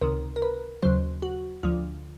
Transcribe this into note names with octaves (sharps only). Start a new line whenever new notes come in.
C#2 C3 D#3 A#4
A#4
B4
D#2 C#3 F#3 C5
F#4
D2 D3 F3 F4